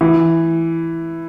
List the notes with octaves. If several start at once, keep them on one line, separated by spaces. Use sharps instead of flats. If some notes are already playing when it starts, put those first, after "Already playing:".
E3